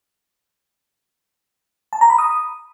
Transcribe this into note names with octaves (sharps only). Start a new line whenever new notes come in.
A5
A#5
B5
D#6